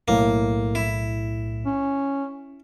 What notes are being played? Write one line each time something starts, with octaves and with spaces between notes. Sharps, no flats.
B1 A2 A#3
E4
C#4